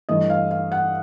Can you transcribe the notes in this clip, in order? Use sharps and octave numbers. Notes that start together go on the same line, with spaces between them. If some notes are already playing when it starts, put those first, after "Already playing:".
G2 E3 A3 D#5
F5
F5
F#5